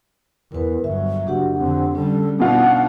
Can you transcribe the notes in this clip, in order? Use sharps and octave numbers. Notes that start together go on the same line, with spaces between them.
E2 A#4 B4
G1 F#3 E5
F#1 D4 F#4 G4 F#5
F2 D3 C4
D3 G3 C#4 A4
B2 D4 D#4 F4 F#5